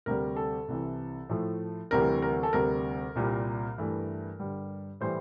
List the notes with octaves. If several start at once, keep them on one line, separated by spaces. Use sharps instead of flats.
D2 C3 G3 A#4
A4
C2 C3 E3
A2 F3 A3
D2 C3 E3 G3 A#4
A#4
A4
D2 C3 G3 A#4
C2 A#2 G3
G2 E3 A3
G2 D3 G3
A2 E3 G3 C5